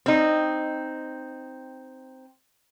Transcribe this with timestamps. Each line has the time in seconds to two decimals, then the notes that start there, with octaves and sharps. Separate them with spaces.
0.06 C4 D#4